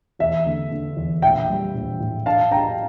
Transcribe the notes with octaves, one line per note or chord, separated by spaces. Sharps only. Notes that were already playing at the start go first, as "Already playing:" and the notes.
E2 E5
D3
D3
E2
A#1 E5 G5
G3
A#1
A2
D4 F5 A5
D4 G5 A#5